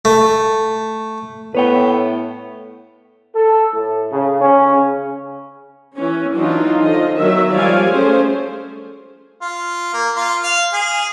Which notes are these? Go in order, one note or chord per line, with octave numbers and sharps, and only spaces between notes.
A3
A2 B3 B4 C#5 G5
A4
A2
C#3
C#4
C#3
E3 C#4
E3 F#3 D4 D#4 F4
D3 F3 F4 D#5
D#3 F#3 B3 E5
F3 G3 C#5 D5 F5 G#5
A3 C#4 G#4 C5
F4
A#3
F4
F5
G#4